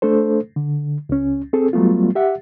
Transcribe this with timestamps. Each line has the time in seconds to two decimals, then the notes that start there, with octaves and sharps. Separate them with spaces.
0.02 A3 D4 A4 C5
0.56 D3
1.09 C#2 C#4
1.53 C4 G#4 A4
1.73 F#3 G3 A3 B3 F4
2.15 G4 E5 F#5